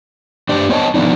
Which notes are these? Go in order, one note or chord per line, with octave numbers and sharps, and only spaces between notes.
D4 G4 C5
B3 C5 C#5 D#5 A5
F3 B3 C4 D4 D#4